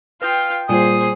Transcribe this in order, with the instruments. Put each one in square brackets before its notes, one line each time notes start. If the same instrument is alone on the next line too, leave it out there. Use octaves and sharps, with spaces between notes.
[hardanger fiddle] F4 G5 [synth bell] B4 D#6 G6 [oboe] F5
[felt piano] A#2 [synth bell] G3 G#5 [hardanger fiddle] G#4 C5 [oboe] D#6